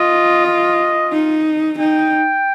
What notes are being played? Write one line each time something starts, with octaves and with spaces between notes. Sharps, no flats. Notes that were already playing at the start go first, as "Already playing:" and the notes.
Already playing: F4 D#5
D#5
D#4
D#4 G5